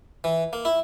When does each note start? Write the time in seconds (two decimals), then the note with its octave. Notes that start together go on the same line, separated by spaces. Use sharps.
0.24 E3
0.53 A#3
0.65 E4